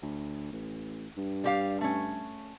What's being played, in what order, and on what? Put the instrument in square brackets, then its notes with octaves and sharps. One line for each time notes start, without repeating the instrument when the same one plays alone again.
[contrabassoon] D2
A1
G2
[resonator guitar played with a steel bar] G3 G4 F5
A3 C#4